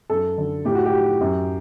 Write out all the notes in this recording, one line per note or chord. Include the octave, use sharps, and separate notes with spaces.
F#2 A4
D3
A2 G4
F#4
G4
F#2